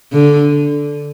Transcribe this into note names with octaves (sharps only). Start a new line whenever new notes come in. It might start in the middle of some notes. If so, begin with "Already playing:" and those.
D3